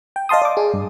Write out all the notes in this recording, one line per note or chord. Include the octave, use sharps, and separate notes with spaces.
G5
D#5 F5 A5 C6 D#6
D5 D6
G#4
G2